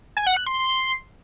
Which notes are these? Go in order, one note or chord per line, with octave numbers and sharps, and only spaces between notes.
G#5
F#5
F#6
C6